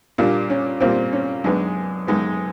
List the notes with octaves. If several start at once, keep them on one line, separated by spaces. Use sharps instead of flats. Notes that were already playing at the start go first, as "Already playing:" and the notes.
A#2 G3 A#3 D4
C#4
A#2 G3 A#3 C4
C#4
F#2 D#3 G#3 B3 D4
F#2 D#3 G#3 B3